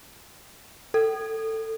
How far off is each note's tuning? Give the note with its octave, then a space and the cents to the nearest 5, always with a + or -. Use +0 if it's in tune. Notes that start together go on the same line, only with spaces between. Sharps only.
A4 +15